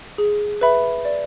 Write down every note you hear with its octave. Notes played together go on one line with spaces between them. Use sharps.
G#4
B4 E5 B5
D5